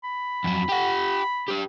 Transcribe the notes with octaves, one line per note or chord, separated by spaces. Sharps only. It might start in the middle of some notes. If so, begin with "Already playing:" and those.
B5
F2 F#3
G4 F#5
G4 B4